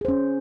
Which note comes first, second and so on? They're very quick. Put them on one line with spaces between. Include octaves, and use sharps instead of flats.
G#4 C5 C#4